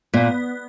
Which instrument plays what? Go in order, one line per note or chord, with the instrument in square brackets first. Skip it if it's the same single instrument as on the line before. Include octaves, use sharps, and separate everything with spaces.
[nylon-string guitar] A#2 [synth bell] B3